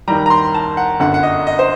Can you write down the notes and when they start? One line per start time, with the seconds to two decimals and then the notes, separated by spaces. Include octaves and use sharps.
0.08 D#2 D#3 G3 A#5
0.26 A#5
0.30 C6
0.54 A5
0.77 F#5
1.00 G1 F#2 D3 F#5
1.14 F#5
1.23 D#5
1.47 D#5
1.59 C5